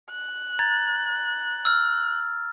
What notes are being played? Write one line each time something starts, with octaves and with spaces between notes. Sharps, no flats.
F#6
A#5 G#6 A6
E6 F6